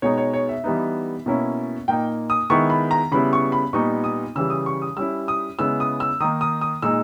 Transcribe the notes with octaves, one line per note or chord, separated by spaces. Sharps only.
B2 G#3 D#4 C#5
C#5
C#5
E5
E3 G3 B3 D#4
B2 A#3 C#4 E4
A#2 A#3 D#4 G5
D#6
D#3 G#3 B3 E4 C#6
B5
A#5
C#3 G3 B3 E4 B5
C#6
B5
A#2 G3 B3 D#4 C#6
D#6
C#3 E3 G3 E6
D#6
C#6
D#6
G3 C#4 E4 E6
D#6
C#3 G#3 B3 E4 E6
D#6
E6
D#3 A#3 D#4 D#6
D#6
D#6
A#2 G#3 D#4 E6